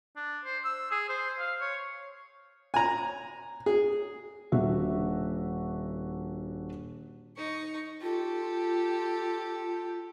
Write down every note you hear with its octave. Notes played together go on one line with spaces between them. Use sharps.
D4
C5
E6
G#4
C5
F5
C#5
G#5 A#5
G#4
D#1 D4 F#4 E5
D#4 C#6
F4 G4 A4